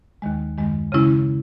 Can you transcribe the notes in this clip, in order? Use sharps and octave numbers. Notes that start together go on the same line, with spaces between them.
D#2 D#3 G#3
F#2 D#3 G#3
C#3 G#3 C#4 E4